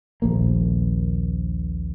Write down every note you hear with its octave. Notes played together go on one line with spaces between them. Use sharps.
D#1 A#1 A#3